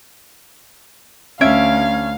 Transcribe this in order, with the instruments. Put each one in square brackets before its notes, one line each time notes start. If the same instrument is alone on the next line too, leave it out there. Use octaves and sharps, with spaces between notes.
[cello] D2 [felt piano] C#4 [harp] E5 G#6 D7 [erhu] F5